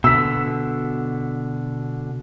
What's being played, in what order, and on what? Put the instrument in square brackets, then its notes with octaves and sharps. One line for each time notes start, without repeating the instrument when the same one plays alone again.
[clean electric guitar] B2 D3 [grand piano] E6 B6